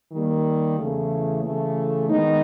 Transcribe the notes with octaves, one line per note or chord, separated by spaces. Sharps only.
D#3 G3 A#3
E2 C#3 E3 A3
C#3 E3 A3
D#3 G#3 B3 D#4